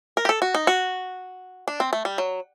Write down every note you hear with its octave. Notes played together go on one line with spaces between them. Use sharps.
A#4
G4
A4
F#4
D#4
F#4
D4
C4
A3
G3
F#3